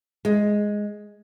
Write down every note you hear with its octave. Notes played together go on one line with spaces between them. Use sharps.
G#3